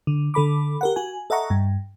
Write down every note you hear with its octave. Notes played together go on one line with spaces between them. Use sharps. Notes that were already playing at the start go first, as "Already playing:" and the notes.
D3
D3 A4 B5 D6
G4 A#4 F#5
F#4 G#5
A4 D#5 E5 F#5 A#5 C#6
G2